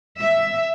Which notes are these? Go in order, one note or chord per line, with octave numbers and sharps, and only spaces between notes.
E5